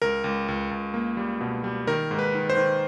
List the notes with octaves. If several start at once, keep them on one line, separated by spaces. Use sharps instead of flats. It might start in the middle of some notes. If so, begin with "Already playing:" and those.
C#2 A#4
C#2
C#2
C#2
A#3
G3
B2
G3
D#3 A#4
G#2
B4
D#3
C5
D#3